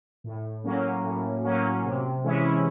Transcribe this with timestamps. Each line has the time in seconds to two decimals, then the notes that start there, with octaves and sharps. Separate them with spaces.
0.24 A2
0.64 F#3 A#3 C#4
1.04 A2
1.44 F#3 A#3 C#4
1.84 C3
2.24 E3 G#3 C#4 E4